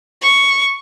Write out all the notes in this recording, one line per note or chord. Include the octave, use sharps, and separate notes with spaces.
C#6